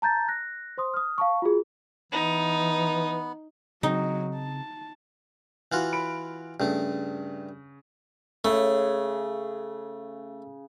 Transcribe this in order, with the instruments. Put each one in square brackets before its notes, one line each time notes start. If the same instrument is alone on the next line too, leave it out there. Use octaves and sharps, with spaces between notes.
[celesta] A5 A#5 G6 A6
F#6 A#6
C5 C6 D#6
D#6 F6
F5 A5 C#6
F4 F#4 G#4
[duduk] E3 [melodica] B3 [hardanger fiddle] D#4
[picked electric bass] C#3 C4 [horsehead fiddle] F#3 [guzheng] D#4
[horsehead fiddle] A5
[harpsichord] E3 F4 F#4
[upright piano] B5 D7
[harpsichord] G2 A3 [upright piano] C#3
[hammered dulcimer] C#3 [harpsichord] A3